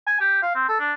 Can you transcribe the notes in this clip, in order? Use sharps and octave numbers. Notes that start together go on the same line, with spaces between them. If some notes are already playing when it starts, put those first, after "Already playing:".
G#5
G4
F5
C4
A4
D4